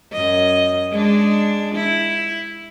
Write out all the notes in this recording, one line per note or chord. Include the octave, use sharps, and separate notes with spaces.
F#2 D#5
G#3 D4
E4